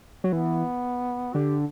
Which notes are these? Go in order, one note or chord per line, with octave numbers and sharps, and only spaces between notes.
F#3
E3 B3
D3 G4